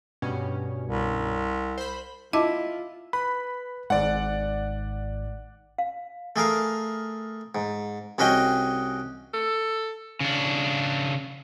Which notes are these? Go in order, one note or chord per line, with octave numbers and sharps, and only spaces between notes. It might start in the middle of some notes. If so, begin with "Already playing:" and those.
G2 B2 C#4
C2
C5 B5
E4 F4 D#5 A5 D6
B4 B5
G#1 G#2 D5 F#5
F5
A3 G#4 A#4 F5
G#2
C2 C#4 F#4 G#4 D#5 G5
A4
C#3 D4